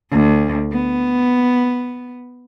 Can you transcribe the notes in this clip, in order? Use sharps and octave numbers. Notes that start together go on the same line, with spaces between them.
D2
B3